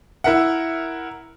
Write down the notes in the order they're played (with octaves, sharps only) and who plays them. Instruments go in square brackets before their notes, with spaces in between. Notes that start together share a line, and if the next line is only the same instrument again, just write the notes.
[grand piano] E4 A#4 E5 F#5